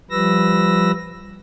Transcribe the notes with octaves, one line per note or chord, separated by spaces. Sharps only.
F3 G3 B4 E6 A#6